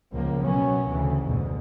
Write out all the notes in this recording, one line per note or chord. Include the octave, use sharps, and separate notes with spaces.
C#2 F3 A#3
B2 F#3 B3 C#4
D2 C#3 E3
F1 D2 G#2 B2